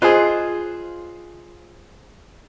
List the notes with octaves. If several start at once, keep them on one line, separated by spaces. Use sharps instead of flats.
F4 G#4 C5 D#5 F#6